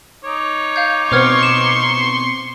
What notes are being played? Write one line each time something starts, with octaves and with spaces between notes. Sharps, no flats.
D#4 C#5 D6
F5 G6
B2 B3 C4 C5 C6 C#6 F6 G#6
E7